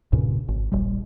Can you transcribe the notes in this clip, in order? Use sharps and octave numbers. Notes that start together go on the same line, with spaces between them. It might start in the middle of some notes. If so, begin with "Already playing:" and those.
C2 G2 A#2 C#3
G#1
E1 A#1 G3